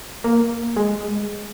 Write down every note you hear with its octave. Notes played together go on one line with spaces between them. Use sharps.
A#3
G#3